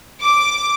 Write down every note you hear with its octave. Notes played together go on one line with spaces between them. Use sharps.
D6